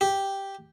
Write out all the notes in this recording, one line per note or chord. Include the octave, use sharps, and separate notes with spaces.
G4